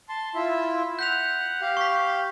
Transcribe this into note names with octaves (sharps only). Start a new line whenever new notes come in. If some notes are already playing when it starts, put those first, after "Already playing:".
A5 C6
E4 F4 E5
F#5 G6 B6 F7
G4 F5
C#6 B6